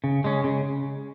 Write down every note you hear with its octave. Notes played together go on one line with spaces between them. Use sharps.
C#3
G#3 C#4
C#3